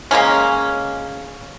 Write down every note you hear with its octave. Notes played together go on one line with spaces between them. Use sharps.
C#3 G#3 A#3 C#4